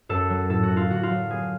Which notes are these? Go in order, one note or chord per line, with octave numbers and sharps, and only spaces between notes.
F#2 A4
F#3
A2 A4
F#4
A2
F4
D3 F#4
F4
F#3
B3 G#4